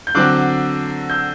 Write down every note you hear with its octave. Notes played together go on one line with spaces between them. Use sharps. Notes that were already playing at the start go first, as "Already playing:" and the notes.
G6
D3 F#3 C4 D6 F#6
E6 G6